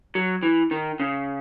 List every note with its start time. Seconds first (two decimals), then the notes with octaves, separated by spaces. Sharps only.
0.15 F#3
0.43 E3
0.71 D#3
1.00 C#3